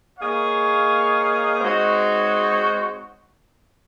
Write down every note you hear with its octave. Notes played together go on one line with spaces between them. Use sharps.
A#3 D#4 G#4 C#5 F5
G#3 C4 D#4 F#4 C#5